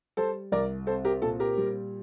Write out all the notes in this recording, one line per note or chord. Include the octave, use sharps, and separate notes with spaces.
G3 A4 C5
C2 A#4 D5
C4 A4 C5
G4 A#4
A#2 A4
G4 A#4
G3